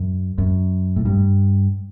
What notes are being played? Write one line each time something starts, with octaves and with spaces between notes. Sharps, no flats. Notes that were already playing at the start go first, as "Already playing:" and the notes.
Already playing: F#2
F#2
A2
G2